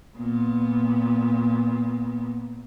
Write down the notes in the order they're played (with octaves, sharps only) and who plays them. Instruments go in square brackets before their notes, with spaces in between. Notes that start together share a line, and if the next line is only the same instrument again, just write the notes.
[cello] A#2 B3